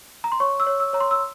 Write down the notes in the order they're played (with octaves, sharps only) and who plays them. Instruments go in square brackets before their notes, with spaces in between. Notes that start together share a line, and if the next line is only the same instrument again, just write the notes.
[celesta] A#5
C6
C#5 C#6
E6
C#5
E6
C#5 A#5
C6
E6